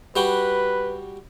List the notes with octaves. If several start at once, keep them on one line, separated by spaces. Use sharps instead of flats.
G3 F#4 B4 G5